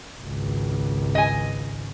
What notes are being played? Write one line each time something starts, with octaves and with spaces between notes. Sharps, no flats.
G#1 C#2
D#5 G#5